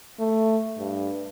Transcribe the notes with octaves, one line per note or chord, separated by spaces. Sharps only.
A3
G2